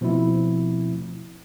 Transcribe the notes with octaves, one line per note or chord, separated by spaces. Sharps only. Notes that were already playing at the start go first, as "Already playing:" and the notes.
B2 F3 A3 C4 E4